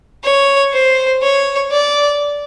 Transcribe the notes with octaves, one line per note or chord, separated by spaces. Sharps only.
C#5
C5
C#5
D5